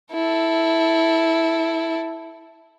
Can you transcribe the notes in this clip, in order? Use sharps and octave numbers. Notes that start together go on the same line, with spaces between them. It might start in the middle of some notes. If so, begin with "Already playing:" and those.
E4 A4